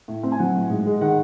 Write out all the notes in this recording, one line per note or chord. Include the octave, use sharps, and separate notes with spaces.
A2
C4
G#5
F#3 F#5
A2
G#2
G#3
D#3 F#5